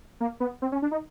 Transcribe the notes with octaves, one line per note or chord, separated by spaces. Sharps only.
A#3
B3
C4
C#4
D4
D#4